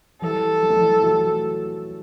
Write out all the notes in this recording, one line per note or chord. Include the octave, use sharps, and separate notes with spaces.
E3 G3 A4
G3
A3
E3 G3
F#3 A3